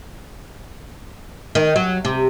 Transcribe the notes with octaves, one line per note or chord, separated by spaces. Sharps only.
D#3
F#3
C3